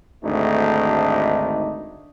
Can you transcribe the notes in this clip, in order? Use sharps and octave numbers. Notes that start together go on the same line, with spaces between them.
G#1 D2 A3 D4 D#4